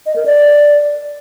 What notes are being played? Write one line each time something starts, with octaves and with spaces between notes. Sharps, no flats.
D#5
A#4
D5